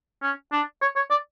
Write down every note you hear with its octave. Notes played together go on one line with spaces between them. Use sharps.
C#4
D4
C#5
C#5
D5